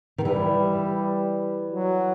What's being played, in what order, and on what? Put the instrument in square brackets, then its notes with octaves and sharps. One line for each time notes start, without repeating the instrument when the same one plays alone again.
[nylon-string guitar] D#3
[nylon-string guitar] E3 [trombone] G3
[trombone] F#3